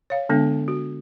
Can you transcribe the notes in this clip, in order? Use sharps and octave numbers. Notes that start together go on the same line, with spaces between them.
C#5 F5
D3 G#3 B3 D4
F#4